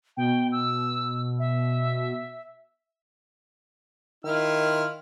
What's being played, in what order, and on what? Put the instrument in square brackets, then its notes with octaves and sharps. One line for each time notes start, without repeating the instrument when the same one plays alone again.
[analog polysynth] B2 [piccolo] G5
[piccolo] E6
E5
[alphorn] D#3 [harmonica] E4 F4 F6